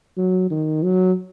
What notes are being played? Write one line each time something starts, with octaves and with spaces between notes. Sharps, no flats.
F#3
D#3
F#3